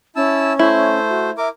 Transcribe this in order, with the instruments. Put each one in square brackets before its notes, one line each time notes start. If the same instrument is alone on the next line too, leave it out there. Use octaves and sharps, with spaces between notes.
[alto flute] C#4 [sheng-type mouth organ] E4 A5 E6
[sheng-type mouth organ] A3 C5 [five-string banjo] E4
[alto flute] F#4
[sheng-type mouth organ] A#4 D6 [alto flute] E5